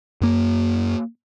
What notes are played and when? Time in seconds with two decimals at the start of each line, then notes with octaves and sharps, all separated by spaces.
0.21 F#2 A#3